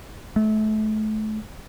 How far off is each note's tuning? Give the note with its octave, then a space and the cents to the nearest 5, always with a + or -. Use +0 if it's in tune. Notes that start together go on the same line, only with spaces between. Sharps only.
A3 -30